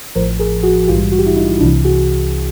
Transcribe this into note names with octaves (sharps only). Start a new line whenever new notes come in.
A1 A2 F3 A#4 C5
G#4 A#4
F#4 G#4
A#1 G#2 E3 G3 F4 G4
F#4
G4
E4 F#4
D#4 F4
C2 C3 E3 D4 E4
F#4 G#4